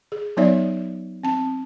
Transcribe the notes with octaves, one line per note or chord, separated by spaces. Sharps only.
G#4
F#3 B3 D#4 C#5 D5 E5
C4 A5